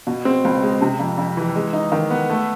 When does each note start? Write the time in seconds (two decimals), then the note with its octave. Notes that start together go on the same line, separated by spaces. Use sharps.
0.07 B2
0.25 C4
0.45 C#2
0.62 G#3
0.82 C3
0.99 F2
1.18 F2
1.37 E3
1.55 G#3
1.73 D#4
1.92 D#3
2.10 B3
2.30 A3